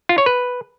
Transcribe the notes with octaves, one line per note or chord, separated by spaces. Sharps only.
F4
C#5
B4